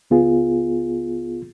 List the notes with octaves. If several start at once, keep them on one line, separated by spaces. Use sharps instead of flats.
C#2 B3 F4 G#4